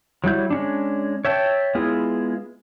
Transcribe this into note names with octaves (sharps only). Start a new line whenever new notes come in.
F#3 G3 E4 G6
G#3 C#4 D4
C#5 E5 G5 A5
G#3 B3 E4 F4 G#4